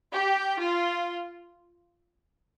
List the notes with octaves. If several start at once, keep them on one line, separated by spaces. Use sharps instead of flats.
G4
F4